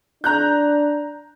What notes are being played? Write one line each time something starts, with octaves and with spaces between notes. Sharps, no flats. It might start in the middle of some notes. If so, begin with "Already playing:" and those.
D4 A#5 F#6 G6